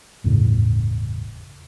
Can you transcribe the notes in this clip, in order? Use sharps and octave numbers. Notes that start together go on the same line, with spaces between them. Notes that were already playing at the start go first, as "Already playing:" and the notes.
G1 E2 A2 C#3